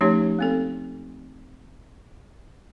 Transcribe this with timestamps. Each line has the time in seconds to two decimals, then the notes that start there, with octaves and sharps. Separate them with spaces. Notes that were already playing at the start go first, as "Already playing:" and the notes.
0.01 F3 A3 C#4 D#4 G4 C#5
0.39 A#3 C4 A4